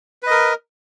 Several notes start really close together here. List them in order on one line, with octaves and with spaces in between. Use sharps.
B4 D#5 A#4